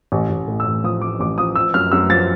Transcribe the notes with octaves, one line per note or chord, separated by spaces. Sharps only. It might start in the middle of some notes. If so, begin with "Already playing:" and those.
A1
A1
A2
E6
A1
F3 D#6
F3 D6
A1 D6
F3 D#6
F3 E6
F#2 F6
F#2 E6
F3 A6